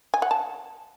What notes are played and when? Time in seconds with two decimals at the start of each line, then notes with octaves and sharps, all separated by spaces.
0.14 G#5
0.22 F#5
0.31 A5